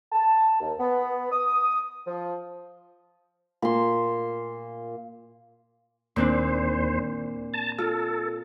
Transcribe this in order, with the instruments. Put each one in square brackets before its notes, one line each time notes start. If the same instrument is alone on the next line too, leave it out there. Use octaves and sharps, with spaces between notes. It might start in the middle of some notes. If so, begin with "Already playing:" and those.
[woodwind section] A5
D#2
B3
D#6
F3
[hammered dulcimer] A#2 C6
[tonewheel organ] D#2 C5 [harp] A#2 C4 D4
[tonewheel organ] A5
[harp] F4 [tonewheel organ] A4